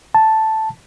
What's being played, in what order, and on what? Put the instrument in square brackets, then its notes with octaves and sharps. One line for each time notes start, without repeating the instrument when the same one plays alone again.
[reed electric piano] A5